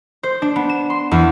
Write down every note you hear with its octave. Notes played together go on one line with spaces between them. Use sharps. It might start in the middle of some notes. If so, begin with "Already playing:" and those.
C5
D4
B3
E7
C6
E2